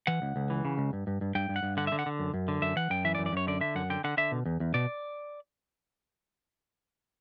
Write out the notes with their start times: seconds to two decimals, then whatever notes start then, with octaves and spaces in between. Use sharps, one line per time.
0.07 E3 F#5
0.22 C#2
0.36 C#2
0.50 E3
0.65 C#3
0.78 C#2
0.93 G2
1.07 G2
1.21 G2
1.35 G2 G5
1.49 G2
1.56 F#5
1.63 G2
1.77 D3 F#5
1.87 E5
1.92 D3
1.99 F#5
2.06 D3
2.19 F#2
2.34 F#2
2.48 D3
2.62 F#2 E5
2.76 E3 F#5
2.90 F#2 G5
3.05 E3 E5
3.15 D5
3.18 F#2
3.26 D5
3.33 F#2 C#5
3.47 D3 D5
3.61 D3 E5
3.75 F#2 F#5
3.90 D3 G5
4.04 D3 F#5
4.17 D3 E5
4.32 B2
4.46 E2
4.60 E2
4.74 B2 D5